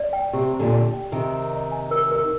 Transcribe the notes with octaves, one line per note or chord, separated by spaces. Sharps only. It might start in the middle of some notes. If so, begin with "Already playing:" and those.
Already playing: D5
G5
C3 G4
A#5
A#2 D3
D5
G5
C3 D#3 A#4
A#4
D#5
G#5
A#4
A#4